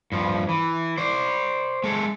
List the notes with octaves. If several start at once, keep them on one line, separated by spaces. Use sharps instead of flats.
G2 F3
E3
C5 D5
G#3 A4